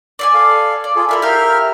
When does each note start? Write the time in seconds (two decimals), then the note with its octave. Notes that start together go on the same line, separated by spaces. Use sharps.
0.19 D5 E5 G#5
0.34 A4 F5
0.84 D5
0.96 F4 G#4 A4
1.09 A3 E4 A#4 B5
1.22 G4 A#4 E5 F5 F6